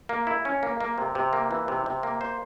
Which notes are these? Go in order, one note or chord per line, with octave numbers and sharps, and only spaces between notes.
A#3
E4
C#4
A#3
A#3
C3
C3
A#3
E3
C3
C3
A#3
C5